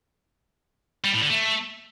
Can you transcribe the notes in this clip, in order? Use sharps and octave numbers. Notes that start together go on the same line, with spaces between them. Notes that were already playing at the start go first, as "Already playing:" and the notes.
G3
A2
D3
A3